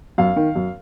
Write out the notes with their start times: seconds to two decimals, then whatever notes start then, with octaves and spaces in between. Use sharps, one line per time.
0.18 F#2 F5
0.36 D#3
0.55 F#2